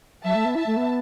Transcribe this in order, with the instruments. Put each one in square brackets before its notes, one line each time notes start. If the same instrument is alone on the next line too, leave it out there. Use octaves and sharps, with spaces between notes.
[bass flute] F#3 [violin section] E5 A5
[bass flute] A3
B3
[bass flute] E4 [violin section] E5 A5
[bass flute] A3
B3